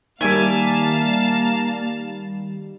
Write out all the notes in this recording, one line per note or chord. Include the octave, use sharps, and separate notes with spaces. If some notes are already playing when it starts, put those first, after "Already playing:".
D#3 G3 A#3 E5 F5 G#5 A5 D6